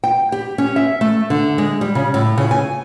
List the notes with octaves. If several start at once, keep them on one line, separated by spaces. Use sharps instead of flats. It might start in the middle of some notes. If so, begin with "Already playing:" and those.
G5
G4
C#4
E5
A3
D3
G#3
G3
C#3
A2
C#3
G#5